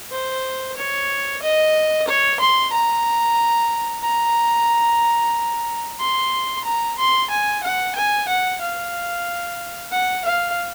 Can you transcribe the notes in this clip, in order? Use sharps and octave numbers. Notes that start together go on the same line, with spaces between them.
C5
C#5
D#5
C#5
C6
A#5
A#5
C6
A#5
C6
G#5
F#5
G#5
F#5
F5
F#5
F5